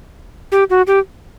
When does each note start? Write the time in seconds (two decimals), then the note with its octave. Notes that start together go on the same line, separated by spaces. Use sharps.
0.52 G4
0.70 F#4
0.87 G4